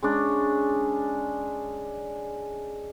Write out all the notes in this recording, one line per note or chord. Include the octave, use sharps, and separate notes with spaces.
G#3 C#4 D4